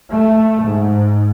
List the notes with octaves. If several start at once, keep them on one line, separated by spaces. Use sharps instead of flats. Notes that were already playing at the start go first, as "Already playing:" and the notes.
A3
G#2